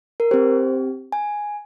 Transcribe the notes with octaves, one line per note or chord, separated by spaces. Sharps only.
A#4
C4 G4 C5
G#5